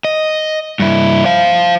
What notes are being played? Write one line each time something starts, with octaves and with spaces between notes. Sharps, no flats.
D#5
G2 E4
C5 F5